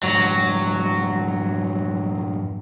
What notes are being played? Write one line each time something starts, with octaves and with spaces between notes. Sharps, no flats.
F2 G#2 F#3